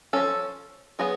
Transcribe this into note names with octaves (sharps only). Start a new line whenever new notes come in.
F3 A3 C#4 A4
F#3 B3 G#4